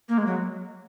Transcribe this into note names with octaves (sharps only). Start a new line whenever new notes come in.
A#3
G#3
F#3